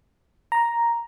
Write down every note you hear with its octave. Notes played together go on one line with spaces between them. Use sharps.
A#5